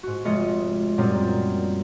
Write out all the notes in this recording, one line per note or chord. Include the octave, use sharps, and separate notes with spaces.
G#2 F#4
F1 G#3 F4 D#5 C#7
F#2 A#2 G3 C4 D#4 F4